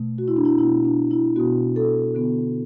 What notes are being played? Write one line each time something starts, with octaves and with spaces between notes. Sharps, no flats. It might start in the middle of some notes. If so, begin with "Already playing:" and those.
Already playing: B2 A3
F#4
E4
D4
E4
B2 B3 E4
D4
E4
B2 B3 F#4
A4
D3 B3